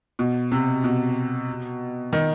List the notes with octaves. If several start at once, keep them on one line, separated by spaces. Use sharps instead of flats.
B2
C3
B2
D#3